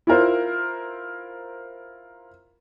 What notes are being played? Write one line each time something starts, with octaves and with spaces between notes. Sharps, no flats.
E4 F4 A#4 C5